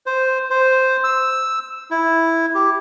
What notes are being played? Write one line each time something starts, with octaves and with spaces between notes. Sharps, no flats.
C5
C5
E6
E4
G4